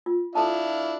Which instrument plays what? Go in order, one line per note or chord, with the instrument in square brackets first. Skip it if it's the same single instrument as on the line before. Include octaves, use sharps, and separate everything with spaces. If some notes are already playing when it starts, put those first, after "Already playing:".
[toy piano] F4
[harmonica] D4 E4 F5 [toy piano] A4 A5